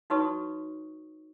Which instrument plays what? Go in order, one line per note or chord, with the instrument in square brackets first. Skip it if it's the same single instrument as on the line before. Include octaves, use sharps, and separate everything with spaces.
[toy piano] D#4 F#4 B4 C#5 C#6 D#6